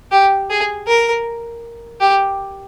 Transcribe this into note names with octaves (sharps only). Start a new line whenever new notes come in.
G4
G#4
A#4
G4